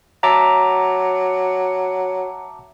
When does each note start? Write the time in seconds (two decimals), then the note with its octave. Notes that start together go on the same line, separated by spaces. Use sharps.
0.23 F#3 E5 A5 A#5 D6